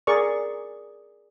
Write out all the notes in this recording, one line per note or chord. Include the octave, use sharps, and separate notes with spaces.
G#4 A#4 D5 C#6